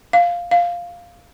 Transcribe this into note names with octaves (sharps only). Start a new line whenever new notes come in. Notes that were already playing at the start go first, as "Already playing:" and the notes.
F5
F5